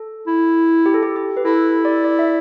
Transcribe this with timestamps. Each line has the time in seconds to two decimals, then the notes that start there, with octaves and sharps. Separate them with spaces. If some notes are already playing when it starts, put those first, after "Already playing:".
Already playing: A4
0.27 E4
0.86 G4
0.94 A4
1.03 G4
1.16 G4
1.37 B4
1.45 E4 A4
1.85 D5
2.04 D5
2.19 E5